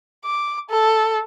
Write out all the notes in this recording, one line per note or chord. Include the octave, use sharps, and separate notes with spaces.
D6
A4